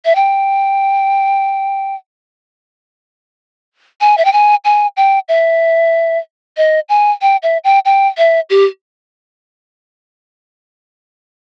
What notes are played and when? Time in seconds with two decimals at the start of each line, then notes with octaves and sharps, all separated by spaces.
0.05 E5
0.15 G5
4.01 G#5
4.18 E5
4.25 G5
4.33 G#5
4.65 G#5
4.97 G5
5.29 E5
6.57 D#5
6.89 G#5
7.22 G5
7.43 E5
7.64 G5
7.85 G5
8.18 E5
8.50 G4